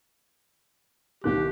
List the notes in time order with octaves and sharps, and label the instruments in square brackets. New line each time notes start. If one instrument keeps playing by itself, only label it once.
[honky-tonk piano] C2 D#3 F#6 [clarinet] G4